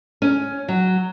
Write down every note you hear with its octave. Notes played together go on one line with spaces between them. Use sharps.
C#4
F#3